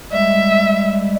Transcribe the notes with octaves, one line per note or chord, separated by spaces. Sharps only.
G3 G#3 E5